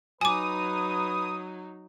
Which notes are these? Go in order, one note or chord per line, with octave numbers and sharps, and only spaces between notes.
F#3 D#4 B4 G#5 D6 D#6